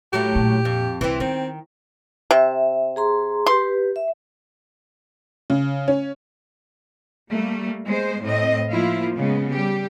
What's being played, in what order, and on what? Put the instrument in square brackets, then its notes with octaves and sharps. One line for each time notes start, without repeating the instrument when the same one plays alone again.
[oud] A2 F#3 A3 [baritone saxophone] G4
[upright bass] A#2
[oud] F2
[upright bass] C2 [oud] E3 C4
[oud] D#3 [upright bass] B3 [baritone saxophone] C4
[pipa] C3 [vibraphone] E5
[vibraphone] G#4 A#5 C6
[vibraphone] G4 B4 [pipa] C6
[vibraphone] E5
[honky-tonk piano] C#3
C#4
[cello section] G3 A3 A#3
G#3 B3 C5
A2 C4 D#5
F3 A#3 E4 F4
C#3 G#3 B3
G3 G4